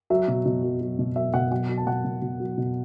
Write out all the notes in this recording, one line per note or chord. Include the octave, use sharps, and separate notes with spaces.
F#3 E5
B2
B2
F#3
F#3
B2
F#3 E5
B2 F#5
F#3 F#5
F#3
A5
B2 F#5
B2
B2
F#3
B2